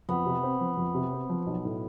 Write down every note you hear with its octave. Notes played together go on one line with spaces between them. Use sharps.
F2 B3
C3
C4
F3
F2
C3
C4
F3
B1
A2